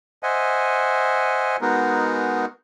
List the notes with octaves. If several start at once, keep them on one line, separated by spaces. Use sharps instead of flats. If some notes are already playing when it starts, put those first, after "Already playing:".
C5 D#5 E5 F#5 G#5
G#3 B3 D#4 F#4 G#4 A#4